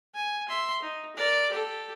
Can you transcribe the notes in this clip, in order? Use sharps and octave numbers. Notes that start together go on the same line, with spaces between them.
G#5
E5 C6
D#4
A#4 D5
G4 A4